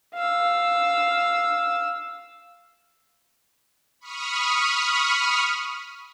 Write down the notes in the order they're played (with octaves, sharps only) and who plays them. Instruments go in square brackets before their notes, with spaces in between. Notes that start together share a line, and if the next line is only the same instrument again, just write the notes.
[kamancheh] F5 E6
[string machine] B5 C#6 D#6 F6